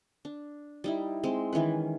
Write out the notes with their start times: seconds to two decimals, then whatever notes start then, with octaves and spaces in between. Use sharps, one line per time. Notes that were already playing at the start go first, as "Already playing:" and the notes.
0.25 D4
0.84 G3 D#4 E4
1.23 G#3 C4
1.53 D#3 E3 C#4 B4